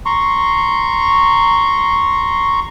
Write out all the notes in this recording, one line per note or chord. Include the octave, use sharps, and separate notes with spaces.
A#5 C6 C#6